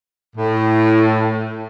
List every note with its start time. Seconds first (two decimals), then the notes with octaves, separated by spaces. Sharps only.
0.35 A2